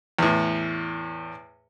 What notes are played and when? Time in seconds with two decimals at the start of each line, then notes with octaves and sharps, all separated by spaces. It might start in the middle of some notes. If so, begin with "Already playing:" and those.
0.19 E2 A2